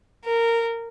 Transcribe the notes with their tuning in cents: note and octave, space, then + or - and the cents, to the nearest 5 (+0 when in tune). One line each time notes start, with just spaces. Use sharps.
A#4 -15